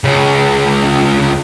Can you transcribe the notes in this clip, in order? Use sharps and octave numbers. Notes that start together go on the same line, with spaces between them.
C#2 C#3